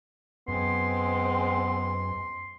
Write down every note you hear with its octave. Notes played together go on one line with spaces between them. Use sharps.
F#2 G#3 B3 C4 C6